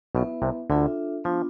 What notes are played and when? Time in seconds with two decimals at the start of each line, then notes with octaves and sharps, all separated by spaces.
0.15 B1 B2 B3 E4 B4 E5
0.42 C2 C3
0.70 D2 D3 D4 F4 A4 E5
1.24 F3 B3 D4 F4